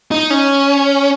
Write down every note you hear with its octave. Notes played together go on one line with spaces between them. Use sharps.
D#4
C#4